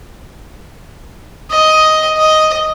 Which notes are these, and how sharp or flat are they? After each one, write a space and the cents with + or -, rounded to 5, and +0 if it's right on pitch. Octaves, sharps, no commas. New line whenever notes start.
D#5 +10
D#5 +5